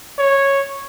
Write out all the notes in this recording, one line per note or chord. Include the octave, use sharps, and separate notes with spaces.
C#5